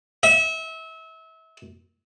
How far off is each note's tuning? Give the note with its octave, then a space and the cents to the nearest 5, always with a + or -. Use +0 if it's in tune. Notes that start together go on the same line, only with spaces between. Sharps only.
E5 -30